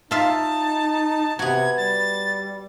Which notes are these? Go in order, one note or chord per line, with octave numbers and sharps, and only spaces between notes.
D#4 F4 E5 F5 A5
C3 B3 F#4 G#6
G3 A6